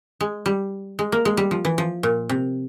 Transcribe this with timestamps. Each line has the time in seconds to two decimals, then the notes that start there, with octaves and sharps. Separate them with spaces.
0.21 G#3
0.46 G3
0.99 G#3
1.12 A#3
1.25 G#3
1.37 G3
1.51 F3
1.65 E3
1.78 F3
2.03 A#2
2.29 C3